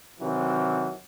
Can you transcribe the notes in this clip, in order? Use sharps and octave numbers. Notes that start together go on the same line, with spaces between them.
C3 D#3 E3 F#3